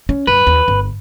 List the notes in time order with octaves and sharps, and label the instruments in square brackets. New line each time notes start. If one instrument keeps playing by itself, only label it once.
[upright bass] C#4
[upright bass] F#2 [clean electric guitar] B4
[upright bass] D#2
G1